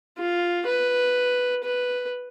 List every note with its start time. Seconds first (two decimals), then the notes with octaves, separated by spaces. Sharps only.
0.18 F4
0.66 B4
1.64 B4